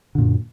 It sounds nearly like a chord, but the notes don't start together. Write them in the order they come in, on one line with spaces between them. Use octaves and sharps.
D3 A#2 F#2